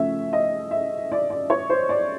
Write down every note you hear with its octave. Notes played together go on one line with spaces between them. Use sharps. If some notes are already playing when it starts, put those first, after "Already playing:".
Already playing: C#3 F3 A3 C#4 E5
D#5
E5
D5
D5
C#5
C5
D5